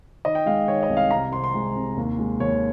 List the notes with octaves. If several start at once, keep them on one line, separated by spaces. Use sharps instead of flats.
D#3 D#5
G5
G#3 F5
D#3 C#5
D#5
C2
F5
C3 A#5
C3 C6
C6
G#3
C3
D#2
G#3
D#2 C#5